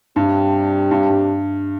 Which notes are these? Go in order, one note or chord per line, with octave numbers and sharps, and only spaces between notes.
G2 C3 G3 D4 G4
G2
G2